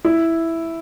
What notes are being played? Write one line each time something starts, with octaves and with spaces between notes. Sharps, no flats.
E4